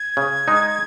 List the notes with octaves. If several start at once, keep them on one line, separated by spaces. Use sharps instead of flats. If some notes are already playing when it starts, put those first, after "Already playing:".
Already playing: G#6
C#3
G#3 D#4